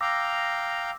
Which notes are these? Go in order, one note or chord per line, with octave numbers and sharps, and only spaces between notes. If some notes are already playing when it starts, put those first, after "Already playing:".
F5 G5 A#5 D6 E6 A#6